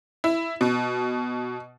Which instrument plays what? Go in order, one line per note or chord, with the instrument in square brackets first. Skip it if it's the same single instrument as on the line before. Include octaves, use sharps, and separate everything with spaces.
[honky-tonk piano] E4
B2